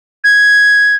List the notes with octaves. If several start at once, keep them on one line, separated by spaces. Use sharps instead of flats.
G#6